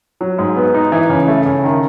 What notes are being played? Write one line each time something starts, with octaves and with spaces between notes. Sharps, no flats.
F#3
G#2
B3
D#4
E3
C#3
A3
C#3
D#3